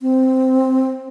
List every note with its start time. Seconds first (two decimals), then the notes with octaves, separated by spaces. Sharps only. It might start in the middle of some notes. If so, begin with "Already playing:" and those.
0.01 C4